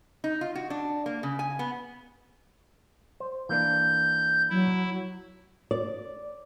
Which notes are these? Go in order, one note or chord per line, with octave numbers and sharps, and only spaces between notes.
D#4
F4
F#4
D4
A#3
C#3
G#5
B3
C5
E3 A#3 D4 G6
F#3 E4
D5